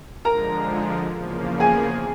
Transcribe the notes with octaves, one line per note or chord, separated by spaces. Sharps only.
D3 F3 G#3 A#4 A#5
E2 C#3 F3 A#3
G#4 G#5